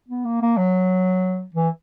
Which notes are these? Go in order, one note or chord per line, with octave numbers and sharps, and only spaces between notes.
B3
A#3
A#3
F#3
E3